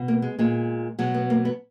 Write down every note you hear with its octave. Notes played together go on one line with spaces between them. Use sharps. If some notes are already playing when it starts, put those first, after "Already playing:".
Already playing: B2
A#3
G#3
A#2 G#3
B2 F#3 G#3
B3
A#3
B3